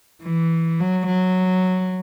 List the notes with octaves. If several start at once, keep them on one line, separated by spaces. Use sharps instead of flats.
E3
F#3
F#3